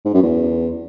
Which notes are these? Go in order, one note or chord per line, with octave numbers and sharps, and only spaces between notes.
G#2
F#2
E2